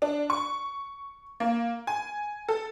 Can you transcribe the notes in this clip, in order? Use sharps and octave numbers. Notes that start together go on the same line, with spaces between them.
D4
C#6
A#3
G#5
A4